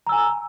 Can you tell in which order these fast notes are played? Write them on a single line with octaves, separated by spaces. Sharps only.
A#5 E6 G#5